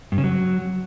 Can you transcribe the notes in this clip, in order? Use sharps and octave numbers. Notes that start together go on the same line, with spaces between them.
G2
C#3
F#3